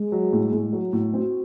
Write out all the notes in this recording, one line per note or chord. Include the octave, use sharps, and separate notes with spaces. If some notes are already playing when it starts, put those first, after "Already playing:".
Already playing: G#3
F#3
A2
A2
F#3
A2
C4 F#4